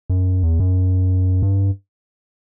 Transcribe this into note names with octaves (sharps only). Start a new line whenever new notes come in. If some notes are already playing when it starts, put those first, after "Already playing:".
F#2
E2
F#2
G2